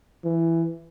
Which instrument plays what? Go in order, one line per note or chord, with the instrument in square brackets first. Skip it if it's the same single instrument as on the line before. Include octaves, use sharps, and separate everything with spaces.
[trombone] E3